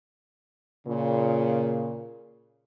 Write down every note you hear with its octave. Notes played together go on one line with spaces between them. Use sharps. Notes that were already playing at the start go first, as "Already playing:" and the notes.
A#2 C#3